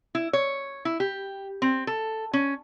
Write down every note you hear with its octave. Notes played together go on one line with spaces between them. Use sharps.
E4
C#5
E4
G4
C4
A4
C#4